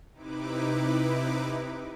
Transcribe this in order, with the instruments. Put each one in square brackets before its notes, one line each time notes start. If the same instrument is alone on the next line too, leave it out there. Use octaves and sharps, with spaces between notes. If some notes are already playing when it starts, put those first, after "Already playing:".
[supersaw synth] C3 D#4 E4 B4 D6